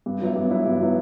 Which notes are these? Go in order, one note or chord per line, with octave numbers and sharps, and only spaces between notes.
G2
F#3 B3 E4
G2
F#3 B3 E4
G2
F#3 B3 E4